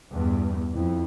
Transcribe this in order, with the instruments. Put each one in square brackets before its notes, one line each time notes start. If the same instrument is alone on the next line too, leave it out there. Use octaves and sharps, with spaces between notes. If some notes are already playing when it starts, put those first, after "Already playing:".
[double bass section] E2 G2
[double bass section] F2 [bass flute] E4